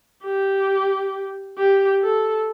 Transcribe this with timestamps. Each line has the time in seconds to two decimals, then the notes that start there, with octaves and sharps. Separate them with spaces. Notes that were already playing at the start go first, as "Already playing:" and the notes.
0.24 G4
1.58 G4
2.02 A4